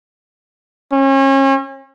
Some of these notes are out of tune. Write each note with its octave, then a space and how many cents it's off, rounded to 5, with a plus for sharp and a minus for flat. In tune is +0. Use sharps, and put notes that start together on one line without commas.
C#4 -35